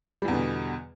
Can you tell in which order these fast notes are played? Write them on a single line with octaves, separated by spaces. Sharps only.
G3 E3 E2 D3 B2